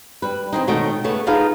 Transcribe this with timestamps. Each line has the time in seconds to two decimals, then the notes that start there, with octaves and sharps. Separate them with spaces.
0.22 G3 B4
0.53 E3 C4 D#4
0.67 B2 D#3 A3 C#5 D#5 G5
1.04 C#3 A3 B3
1.27 D#4 F4 G#4 A4 B4 F5